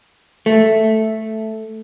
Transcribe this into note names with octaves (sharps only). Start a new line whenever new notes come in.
A3